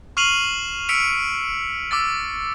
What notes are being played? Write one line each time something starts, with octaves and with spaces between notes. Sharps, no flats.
C#6 F6 C7 D#7 F7 F#7
E6 B6 C#7 D7 F7
D6 E6 A6